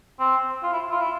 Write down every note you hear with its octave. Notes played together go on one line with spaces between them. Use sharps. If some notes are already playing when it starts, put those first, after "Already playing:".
C4
F4
E4
F4
E4